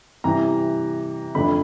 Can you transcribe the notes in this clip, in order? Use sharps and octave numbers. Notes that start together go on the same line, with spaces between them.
C3 E3 G3 A#5
F2 D3 F3 A3 D4 B5